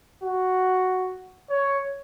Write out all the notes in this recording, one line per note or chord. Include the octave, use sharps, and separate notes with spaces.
F#4
C#5